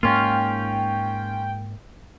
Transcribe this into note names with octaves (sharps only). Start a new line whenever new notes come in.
G#2 A#3 C#4 F4 G5